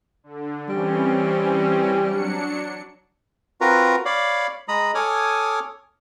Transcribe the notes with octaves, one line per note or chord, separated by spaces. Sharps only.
D3
E3 G3 C4 C#4
F#3 D4 C#7
C4 F4 F#4 A#4 B4 A#5
C#5 D5 F5 B5 D6
G#3 A#5 B5 D#6
A4 C#5 G#5 D6 D#6 F6